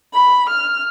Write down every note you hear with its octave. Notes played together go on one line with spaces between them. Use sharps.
B5
F6